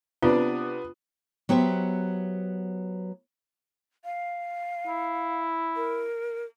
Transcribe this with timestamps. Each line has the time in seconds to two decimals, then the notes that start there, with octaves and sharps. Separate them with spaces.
0.22 C3 B3 D4 F4
1.49 F#3 B3 G4 C5 E5
4.05 F5
4.87 E4
5.76 A#4